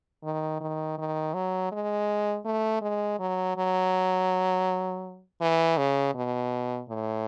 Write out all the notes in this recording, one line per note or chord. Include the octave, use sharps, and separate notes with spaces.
D#3
D#3
D#3
F#3
G#3
A3
G#3
F#3
F#3
E3
C#3
B2
A2